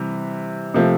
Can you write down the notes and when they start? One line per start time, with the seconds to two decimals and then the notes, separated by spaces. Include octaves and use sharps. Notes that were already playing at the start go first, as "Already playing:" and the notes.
Already playing: C3 E3 G3
0.74 C3 F3 A3